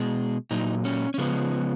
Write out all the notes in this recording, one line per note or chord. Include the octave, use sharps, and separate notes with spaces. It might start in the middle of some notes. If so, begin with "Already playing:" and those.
Already playing: B2 G#3
A#2 F#3 D#4
C#4
C#4
C#3 F3 G#3 B3